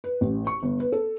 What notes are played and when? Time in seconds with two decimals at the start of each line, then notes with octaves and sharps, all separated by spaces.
0.04 B4
0.21 A1
0.47 C#6
0.63 G1
0.80 B4
0.92 A4